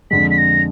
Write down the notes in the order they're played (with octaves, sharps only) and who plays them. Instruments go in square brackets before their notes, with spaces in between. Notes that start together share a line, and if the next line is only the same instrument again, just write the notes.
[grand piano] F2 D3 G#3 [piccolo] B6
[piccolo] B6
A#6